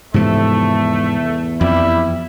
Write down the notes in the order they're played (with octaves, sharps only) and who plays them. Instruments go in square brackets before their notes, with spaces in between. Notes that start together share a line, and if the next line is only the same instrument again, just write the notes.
[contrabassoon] E2 [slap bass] G#2 C3 F3 [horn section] A3
[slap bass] F2 [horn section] G3 E4